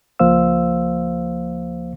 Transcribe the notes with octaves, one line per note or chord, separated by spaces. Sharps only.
C#2 F3 A#3 C5 F5 E6